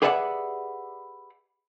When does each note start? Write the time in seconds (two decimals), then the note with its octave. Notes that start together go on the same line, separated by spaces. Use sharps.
0.02 G4 G#4 B4 D5 E5 F#5